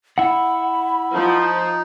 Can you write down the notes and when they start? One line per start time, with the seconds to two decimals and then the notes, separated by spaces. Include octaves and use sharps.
0.18 E4 F#5 B5
1.15 F3 D#4